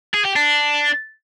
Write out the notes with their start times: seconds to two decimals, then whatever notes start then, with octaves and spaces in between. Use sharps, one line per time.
0.14 G#4
0.25 G4
0.36 D4